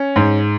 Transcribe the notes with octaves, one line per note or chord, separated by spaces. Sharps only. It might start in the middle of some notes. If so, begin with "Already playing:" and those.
Already playing: C#4
G#2